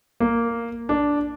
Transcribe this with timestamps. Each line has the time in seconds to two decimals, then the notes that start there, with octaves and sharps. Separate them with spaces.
0.20 A#3
0.89 D4